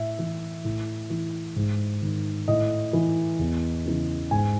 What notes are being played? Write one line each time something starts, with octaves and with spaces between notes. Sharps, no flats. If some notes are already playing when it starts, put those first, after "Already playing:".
Already playing: A2 E5
E3
A2
E3
G#2
D#3
A2 D#5
E3
E2
C#3 E3
G#2 G#5